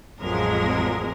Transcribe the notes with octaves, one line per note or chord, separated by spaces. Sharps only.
A1 F2 F3 F#3 G#3 A#4